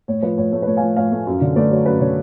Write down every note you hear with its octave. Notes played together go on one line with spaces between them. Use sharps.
A2 C#5
F3 B4
A2 C#5
A3 C#5
B4
A2 C#5
F5 G#5
F3
A2 C#5 F5
A3
F#2
D3
A3 B4 D5
F#3 C#5
F#2 B4
D3 C#5